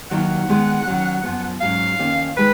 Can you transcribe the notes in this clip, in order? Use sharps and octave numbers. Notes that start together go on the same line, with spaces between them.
D#2 D#3 F#3 F#5
D#3 G#3 B3
D#3 F#3 C#4
F#2 F3 B3
G#2 F#3 C#4 F5
F2 D#3 A#3 C#4
D#3 G#3 B4